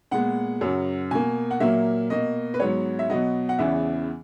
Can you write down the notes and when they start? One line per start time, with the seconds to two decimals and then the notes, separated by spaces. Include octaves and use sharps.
0.11 A#2 G#3 B3 F#5
0.61 F#2 C#3 F#3
1.11 B2 A#3 G#5
1.51 F#5
1.60 A#2 F#3 A#3 E5
2.10 B2 A#3 D#5
2.54 B4
2.59 G#2 F#3 B3 C#5
2.99 E5
3.10 B2 F#3 B3 D#5
3.49 F#5
3.59 E2 C#3 E3 B3 E5